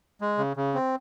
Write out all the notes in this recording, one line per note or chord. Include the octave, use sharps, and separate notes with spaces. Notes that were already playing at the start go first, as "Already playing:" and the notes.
G#3
C#3
C#3
C4